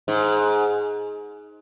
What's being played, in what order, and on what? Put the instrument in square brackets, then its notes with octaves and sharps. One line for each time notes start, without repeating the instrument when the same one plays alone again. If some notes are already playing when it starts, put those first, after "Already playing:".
[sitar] G#2